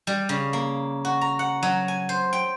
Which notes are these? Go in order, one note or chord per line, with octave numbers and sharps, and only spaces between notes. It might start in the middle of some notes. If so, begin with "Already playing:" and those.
G3
C#3
A#3
F#4
A#5
F#5
F#3
G#5
C5
G5